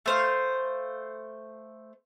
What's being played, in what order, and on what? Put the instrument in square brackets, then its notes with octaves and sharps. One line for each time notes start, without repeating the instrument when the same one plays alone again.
[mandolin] A3 C5 F5